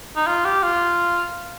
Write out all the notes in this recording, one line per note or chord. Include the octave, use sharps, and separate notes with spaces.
D#4
F4
G4
F4